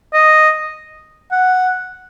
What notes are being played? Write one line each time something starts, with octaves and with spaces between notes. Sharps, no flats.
D#5
F#5